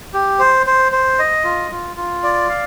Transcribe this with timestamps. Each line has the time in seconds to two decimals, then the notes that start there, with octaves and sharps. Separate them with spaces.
0.14 G4
0.39 C5
0.67 C5
0.92 C5
1.19 D#5
1.44 F4
1.71 F4
1.96 F4
2.23 D5
2.49 F5